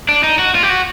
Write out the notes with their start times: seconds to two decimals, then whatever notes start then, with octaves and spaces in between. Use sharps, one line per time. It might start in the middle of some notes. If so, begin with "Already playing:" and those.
0.09 D4
0.24 D#4
0.39 F#4
0.55 F4
0.63 G4
0.69 F#4